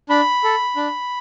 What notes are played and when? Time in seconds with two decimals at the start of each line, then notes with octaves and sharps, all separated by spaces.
0.09 D4 B5
0.44 A4
0.76 D4